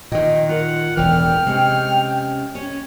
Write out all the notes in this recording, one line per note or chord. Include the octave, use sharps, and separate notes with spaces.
A#2 D#3 D#5 G5
F4 A#4 F#5
E1 A2 E3 G5 F6
C3 G#3 C#4
C#4 C#5